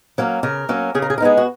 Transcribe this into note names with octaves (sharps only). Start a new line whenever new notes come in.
F#3 A#3 C#4
C#3 A#4
F#3 A#3 C#4
C#3 G#4
A#4
G#4
A#4
G#3 B3 D#4 G#4
F#4